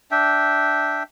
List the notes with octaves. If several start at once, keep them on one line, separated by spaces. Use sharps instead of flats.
D4 E5 G5